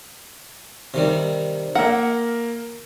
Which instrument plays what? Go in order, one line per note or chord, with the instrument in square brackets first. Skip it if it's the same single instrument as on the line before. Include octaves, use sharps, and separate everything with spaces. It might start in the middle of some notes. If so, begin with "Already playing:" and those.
[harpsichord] C3 D#3 G3
[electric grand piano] A#3 A#4 [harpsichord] E5 [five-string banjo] F#5